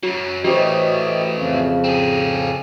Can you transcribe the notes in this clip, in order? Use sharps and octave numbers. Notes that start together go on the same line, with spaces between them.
F#2 F#3 F#4
E3 A3 F#4 G4 C5 C#5 D#5
F2 C#3 F3
C4 G#4